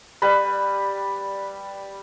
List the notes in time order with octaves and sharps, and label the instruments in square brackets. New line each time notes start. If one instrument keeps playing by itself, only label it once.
[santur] G3 B4 B5